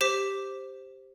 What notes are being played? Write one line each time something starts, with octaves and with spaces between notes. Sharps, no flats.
G4 C5 D6 B6